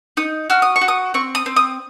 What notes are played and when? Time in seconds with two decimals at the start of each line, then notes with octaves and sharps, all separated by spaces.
0.17 D#4 D#6
0.50 F#4 F6
0.62 D#6
0.76 C#6
0.81 F#4
0.88 D#6
1.14 C4 C#6
1.35 D#6
1.46 C4
1.56 D#6